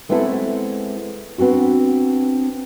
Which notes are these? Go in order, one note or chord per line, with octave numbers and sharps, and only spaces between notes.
G#3 A3 B3 C4 E4 A4
B3 C4 D4 F#4